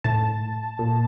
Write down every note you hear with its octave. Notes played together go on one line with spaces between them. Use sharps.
A2 A5
A#2